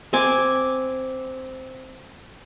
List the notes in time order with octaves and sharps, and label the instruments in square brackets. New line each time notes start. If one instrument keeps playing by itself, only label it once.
[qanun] C4 G#5 D6